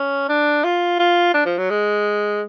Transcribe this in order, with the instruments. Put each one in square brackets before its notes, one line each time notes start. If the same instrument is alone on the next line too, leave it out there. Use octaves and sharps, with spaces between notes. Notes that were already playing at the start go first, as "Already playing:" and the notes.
Already playing: [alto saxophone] C#4
D4
F4
F4
D4
F3
F#3
G#3